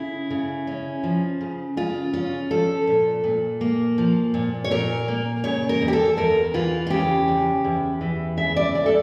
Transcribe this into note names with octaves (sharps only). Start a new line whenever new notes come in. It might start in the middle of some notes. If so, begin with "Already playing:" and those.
Already playing: C#3 E4
C#3
C#4
F3
C#3
C#3 F4
C#4 F4
F3 A4
A#2
A#2
A#3
F3
A#2
C#5
A#2 A#4
A#3
C#3 C#5
A#4
E2
G4
A4
E2 A#4
E3 F4
F4
C#3 G4
E2
E2
E3
C#3 E5
D5
D2 D5
A4